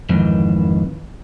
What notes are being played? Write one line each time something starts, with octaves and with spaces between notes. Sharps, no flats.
F2 G#2 D#3 E3